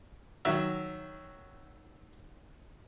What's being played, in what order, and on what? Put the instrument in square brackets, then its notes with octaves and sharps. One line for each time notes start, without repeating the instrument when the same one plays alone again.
[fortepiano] D#3 F#3 [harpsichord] E5